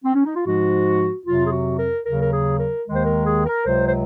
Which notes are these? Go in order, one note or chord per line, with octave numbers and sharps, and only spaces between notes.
C4
C#4
D#4
F4
G#2 F3 G#3 F#4
F2 C3 F#3 F4
G#4
F#4
A#4
D#2 C#3 F#3 A#4
A#4
G#4
A#4
D#2 D#3 G#3
C5
A#4
G#4
A#4
C#2 C3 F#3 C5
C5